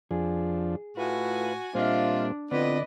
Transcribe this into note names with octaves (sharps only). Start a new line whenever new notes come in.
F2 F3 D4 G#4
A2 F4 F#4 B4 G#5
A#2 G3 C4 D4 F4 C5 D#5 E5
A2 D3 B3 C4 F4 B4 D5 D#5